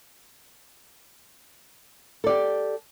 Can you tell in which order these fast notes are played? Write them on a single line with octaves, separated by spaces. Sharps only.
A4 D5 G4